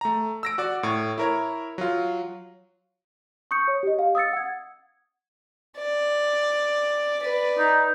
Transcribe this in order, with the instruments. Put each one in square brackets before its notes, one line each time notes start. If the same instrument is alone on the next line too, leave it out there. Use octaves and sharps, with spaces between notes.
[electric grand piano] A3 A#5
E6 A#6 D7
F#4 D5
A2 C#6
E4 A#4 C#5
F#3 F4
[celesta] C#6 D#6 G6 C#7
C#5
G4 D#5
F5
D#6 E6 A6 C#7
F#5 G#6
[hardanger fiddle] D5
B4 D5
[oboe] D#4